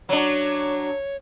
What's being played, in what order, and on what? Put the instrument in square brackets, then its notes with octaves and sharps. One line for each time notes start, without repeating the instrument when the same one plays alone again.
[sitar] F#3 D4 [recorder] C#5